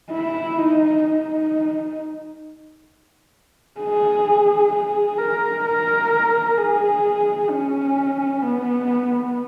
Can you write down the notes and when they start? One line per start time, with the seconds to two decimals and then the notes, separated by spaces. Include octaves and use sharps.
0.11 E4
0.58 D#4
1.04 D#4
3.81 G#4
4.73 G#4
5.18 A#4
5.66 A#4
6.57 G#4
7.50 C#4
8.42 B3